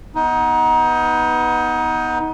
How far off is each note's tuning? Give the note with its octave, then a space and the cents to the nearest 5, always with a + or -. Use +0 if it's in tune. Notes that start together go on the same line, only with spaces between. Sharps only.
B3 +0 D#4 +25 B4 +0